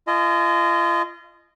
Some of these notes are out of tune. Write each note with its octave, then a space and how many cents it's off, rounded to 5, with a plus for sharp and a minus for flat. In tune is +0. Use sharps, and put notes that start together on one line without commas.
F4 -35 D#5 -15 G#5 +40